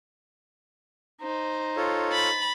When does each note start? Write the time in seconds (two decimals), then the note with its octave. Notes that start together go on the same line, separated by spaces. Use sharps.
1.21 D#4 C5
1.76 F4 A4 C#5
2.11 B5 A6